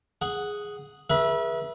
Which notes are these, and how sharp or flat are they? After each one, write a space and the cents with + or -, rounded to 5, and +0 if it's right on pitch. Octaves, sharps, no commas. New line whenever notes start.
G#4 +0 F#5 +0
G#4 +0 B4 -35 E5 +0